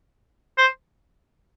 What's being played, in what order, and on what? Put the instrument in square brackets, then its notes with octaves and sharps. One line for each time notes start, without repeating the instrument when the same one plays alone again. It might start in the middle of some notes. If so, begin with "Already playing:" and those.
[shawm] C5